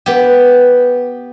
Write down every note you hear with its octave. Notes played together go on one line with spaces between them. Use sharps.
B3 G4